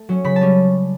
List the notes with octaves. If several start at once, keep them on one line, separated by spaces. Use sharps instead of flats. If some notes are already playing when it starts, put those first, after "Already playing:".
Already playing: A3 A5
F#3 C#4
C#3 B5
A5
G3 C#4